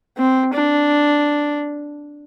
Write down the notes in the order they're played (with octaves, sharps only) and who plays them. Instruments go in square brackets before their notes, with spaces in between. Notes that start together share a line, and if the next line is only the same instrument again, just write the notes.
[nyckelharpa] C4
D4